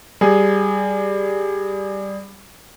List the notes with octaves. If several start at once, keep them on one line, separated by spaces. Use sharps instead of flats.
G3 G#4